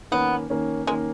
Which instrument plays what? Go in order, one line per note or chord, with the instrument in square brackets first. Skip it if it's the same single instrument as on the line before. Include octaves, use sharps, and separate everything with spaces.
[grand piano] D#3 A#3 C#4 [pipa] B3
[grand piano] D#3 A#3 C#4
[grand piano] D#3 A#3 C#4 [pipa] G#3